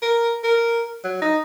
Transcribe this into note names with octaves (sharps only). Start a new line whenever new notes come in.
A#4
A#4
F#3
D#4